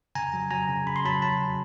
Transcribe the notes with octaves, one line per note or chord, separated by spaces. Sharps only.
C#3 G#5 A#5
F#3
F#3 G#5 A#5
C#3
C#3 B5
C6
F#3 A5 B5
F#3 A5 B5
C#3